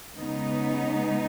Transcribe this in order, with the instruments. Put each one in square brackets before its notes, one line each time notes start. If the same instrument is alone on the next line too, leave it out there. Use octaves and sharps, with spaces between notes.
[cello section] C#3 G#3 B3 D#4